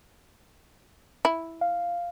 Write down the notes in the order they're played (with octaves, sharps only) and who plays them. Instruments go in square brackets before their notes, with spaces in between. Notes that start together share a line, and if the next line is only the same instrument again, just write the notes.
[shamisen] E4
[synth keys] F5